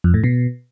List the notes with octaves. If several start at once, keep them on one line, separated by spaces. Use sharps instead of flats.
F2
A2
B2